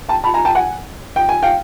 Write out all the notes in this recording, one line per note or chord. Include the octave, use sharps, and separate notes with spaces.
G5 A5
A5 B5
G#5 A#5
G5 A5
F#5 G#5
G5
G#5
F5 G5